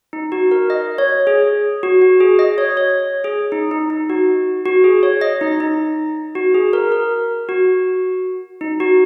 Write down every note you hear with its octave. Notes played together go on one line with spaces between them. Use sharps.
D#4
F#4
A#4
D#5
C#5
G#4
F#4
F#4
G#4
D#5
C#5
C#5
G#4
D#4
D#4
D#4
F#4
F#4
G#4
C#5
D#5
D#4
D#4
F#4
G#4
A#4
A#4
F#4
D#4
F#4